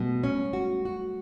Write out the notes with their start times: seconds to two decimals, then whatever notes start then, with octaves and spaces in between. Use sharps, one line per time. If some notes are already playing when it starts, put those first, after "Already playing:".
Already playing: B2 G3 A3
0.24 C#4
0.53 F#4
0.85 F#4